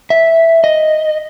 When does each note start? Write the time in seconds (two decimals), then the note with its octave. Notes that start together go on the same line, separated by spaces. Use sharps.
0.10 E5
0.64 D#5